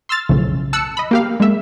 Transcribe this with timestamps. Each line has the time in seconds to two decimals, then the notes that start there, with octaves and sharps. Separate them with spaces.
0.09 C6 E6 F6 A6
0.29 B1 F2 A2 C#3
0.73 A5 E6 F#6 C#7
0.97 D#5 B5
1.11 A#3 G4 F5
1.40 G#3 A#3 E5